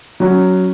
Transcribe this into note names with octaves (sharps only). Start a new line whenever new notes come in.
F#3 C#4 F#4